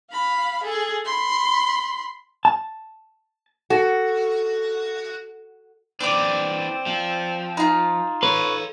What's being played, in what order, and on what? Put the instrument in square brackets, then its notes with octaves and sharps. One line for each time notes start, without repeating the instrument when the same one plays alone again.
[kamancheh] F5 B5
G#4 A4
B5 C6
[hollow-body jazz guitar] A5
[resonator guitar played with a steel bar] F#4 [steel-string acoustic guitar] A4
[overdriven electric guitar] E3 D4 [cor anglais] C4 [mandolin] D5 D6
[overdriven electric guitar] F3
[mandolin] D#4 F4
[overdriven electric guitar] A4 C6 [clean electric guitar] B4 [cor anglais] C#5